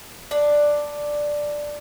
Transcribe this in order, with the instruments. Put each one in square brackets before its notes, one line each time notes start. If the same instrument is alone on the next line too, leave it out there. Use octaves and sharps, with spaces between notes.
[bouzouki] D4 D5